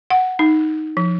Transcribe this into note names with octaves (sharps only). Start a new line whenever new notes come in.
F#5
D#4
F3